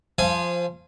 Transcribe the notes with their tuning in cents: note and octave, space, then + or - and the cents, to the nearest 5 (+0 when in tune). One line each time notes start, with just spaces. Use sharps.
F3 +0 F5 -35 G#5 +0